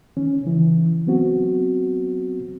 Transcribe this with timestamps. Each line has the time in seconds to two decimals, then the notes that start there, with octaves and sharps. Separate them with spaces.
0.17 D#3 C#4
0.44 C#3 E3
1.07 F#3 B3 C4 F#4